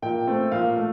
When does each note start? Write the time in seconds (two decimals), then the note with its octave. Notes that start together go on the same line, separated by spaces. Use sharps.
0.02 A#2 G5
0.27 A3 C4
0.52 A#2 F5
0.76 A3